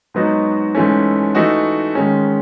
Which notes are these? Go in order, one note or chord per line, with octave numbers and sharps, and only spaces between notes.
G#2 F#3 B3 D#4 F#4
G#2 E3 A3 C#4
E3 A3 D#4 F#4
G#2 D#3 G#3 C#4